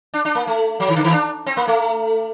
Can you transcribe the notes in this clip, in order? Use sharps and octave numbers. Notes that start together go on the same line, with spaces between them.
D4
D4
A#3
A3
F#3
D#3
D3
D#3
D4
C4
A#3
A3